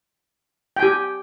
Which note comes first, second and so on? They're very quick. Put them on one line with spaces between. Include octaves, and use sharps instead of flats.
G5 G#5 G4